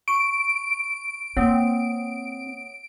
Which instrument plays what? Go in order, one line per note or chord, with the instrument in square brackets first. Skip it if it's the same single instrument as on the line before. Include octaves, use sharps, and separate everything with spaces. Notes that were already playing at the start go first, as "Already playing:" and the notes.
[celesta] C#6 [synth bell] D7
[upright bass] A#3 [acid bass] C4 [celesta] C#5 F#5 D#6